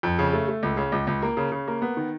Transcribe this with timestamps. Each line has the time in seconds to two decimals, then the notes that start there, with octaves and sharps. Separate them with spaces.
0.03 F2
0.19 C#3
0.33 A3
0.48 A3
0.63 C#2
0.77 C#3
0.92 C#2
1.07 C#2
1.22 A#3
1.37 C#3
1.52 C#3
1.67 A#3
1.82 B3
1.97 D#3